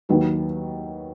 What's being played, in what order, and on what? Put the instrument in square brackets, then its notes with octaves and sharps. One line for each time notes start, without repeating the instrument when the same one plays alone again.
[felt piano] D#2 D#3 F#3 B4